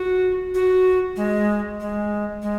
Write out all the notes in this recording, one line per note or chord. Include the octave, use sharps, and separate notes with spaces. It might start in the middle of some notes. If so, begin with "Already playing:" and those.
Already playing: F#4
F#4
G#3
G#3
G#3